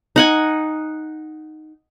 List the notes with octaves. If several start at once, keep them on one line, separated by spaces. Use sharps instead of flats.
D#4 F#5 G#5